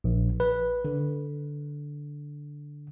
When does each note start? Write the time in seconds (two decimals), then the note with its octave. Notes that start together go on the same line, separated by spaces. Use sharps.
0.04 A#1
0.40 B4
0.85 D3